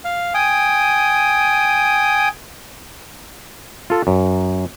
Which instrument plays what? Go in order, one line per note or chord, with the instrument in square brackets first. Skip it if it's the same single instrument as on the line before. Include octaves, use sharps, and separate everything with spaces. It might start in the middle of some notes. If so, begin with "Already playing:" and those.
[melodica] F5
G5 G#5 D#6
[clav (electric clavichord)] F4 A4
F#2